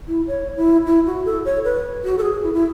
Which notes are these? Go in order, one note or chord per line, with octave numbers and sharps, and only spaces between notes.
E4
C#5
E4
E4
F#4
A4
C#5
B4
F#4
A4
G#4
E4
E4